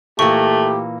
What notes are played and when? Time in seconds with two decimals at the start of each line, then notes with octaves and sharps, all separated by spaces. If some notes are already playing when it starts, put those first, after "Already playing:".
0.19 A#2 E3 A3 A#3 G4 C#6